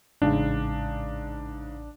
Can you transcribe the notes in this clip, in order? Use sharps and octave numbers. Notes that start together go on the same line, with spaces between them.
A1 G#2 C#3 D4